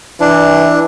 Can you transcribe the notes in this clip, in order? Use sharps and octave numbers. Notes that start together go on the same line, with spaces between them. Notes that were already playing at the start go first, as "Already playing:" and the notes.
E3 D4